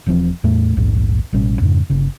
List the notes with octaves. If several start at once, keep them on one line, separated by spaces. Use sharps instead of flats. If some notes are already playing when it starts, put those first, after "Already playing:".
E1 E3 F3 C4
E2 A2 A3
A#1 D#2 G#2
A1 B2 G3 C#4
F2 G#2 C#3
G1 C#3